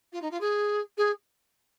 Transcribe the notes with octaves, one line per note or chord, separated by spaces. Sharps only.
F4
D#4
F4
G#4
G#4